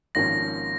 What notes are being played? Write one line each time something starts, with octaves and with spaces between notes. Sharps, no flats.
G#1 G#2 F3 A#3 C#4 A#6